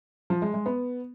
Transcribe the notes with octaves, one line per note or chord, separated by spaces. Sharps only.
F3
G#3
G#3
B3